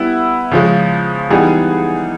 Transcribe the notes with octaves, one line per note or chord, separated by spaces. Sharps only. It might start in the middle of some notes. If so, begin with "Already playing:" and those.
Already playing: G3 B3 E4
C#3 F3 G#3
E3 G3 B3 D#4 G#4